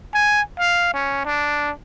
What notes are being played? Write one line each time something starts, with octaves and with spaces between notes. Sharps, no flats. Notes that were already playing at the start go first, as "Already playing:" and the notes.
G#5
F5
C#4
D4